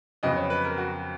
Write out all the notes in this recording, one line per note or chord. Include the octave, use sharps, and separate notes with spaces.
F2 C#3 F#3 B3 D#5
C#5
B4
A#4
F#4